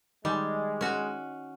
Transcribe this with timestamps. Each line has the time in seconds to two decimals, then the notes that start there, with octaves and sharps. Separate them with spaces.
0.25 D#3 G3 G#3
0.81 C#4 F#4